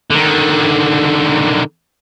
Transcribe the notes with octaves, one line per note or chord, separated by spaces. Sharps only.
D3 D#3